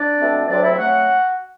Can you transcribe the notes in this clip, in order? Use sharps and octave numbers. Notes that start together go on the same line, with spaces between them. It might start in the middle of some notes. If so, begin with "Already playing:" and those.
Already playing: D4 D5
B2 A3 C4
D2 C3 F#3 C4 D4 D5
E4 E5
F#3 A3 C4 F#4 F#5